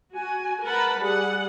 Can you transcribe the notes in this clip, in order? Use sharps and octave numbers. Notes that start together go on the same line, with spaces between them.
F#4 G#5
A#4 B4 F#5 A5 B5
G3 G#4 F#5